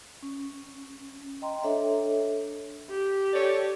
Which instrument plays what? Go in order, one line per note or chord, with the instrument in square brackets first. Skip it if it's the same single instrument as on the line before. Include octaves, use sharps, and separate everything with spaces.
[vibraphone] C#4
D#5 G5 A#5 C6
D4 A4 C#5 E5
[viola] G4
[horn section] A4 C#5 D5